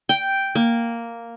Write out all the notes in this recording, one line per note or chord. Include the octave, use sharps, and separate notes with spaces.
G5
A#3